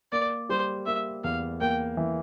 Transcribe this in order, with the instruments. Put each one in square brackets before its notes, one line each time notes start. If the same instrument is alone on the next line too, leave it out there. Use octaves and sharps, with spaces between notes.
[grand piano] A#3 [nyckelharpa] D5
[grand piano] G3 [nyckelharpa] C5
[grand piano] A#3 [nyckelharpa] E5
[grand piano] E2 [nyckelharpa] F5
[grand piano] A#3 [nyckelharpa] G5
[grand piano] E3